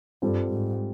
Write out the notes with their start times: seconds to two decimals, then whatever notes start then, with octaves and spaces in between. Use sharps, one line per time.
0.22 G2 G3 C4 F4 A4
0.51 G#2